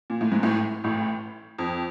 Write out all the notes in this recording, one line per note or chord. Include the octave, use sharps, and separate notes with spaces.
A#2
A2
G#2
A1 A2
A1 A2
F2